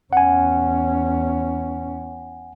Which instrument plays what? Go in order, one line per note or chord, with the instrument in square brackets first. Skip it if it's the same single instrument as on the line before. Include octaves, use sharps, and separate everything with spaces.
[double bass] E2 C#4 [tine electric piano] F#5 G#5